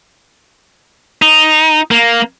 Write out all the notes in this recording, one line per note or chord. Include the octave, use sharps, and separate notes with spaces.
D#4
A#3